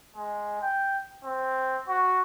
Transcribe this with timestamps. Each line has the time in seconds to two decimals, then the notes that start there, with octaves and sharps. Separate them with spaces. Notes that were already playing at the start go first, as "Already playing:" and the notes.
0.16 G#3
0.61 G5
1.25 C4
1.88 F#4